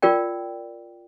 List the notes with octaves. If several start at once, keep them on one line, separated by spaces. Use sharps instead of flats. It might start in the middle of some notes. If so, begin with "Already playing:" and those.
F4 A#4 D5 G5